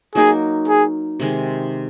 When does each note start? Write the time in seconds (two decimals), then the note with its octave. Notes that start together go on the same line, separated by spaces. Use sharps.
0.15 F#3 A#3 D#4 G#4 A#4
0.68 G#4
1.20 C3 D#3 G#3